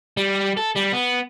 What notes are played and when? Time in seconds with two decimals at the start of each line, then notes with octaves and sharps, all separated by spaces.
0.17 G3
0.57 A4
0.76 G3
0.94 B3